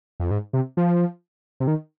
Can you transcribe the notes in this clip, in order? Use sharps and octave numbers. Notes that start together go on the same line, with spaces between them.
F2
G#2
C3
F3
C3
D#3